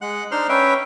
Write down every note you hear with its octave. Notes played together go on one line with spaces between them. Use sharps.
G#3 F#5 F#6
D4 D#4 C5 C6 F6
C#4 B4 E5 G5